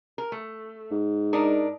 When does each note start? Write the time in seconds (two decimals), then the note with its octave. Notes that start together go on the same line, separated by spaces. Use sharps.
0.18 A#4
0.32 A3
0.91 G#2
1.33 D4 D#4 A#4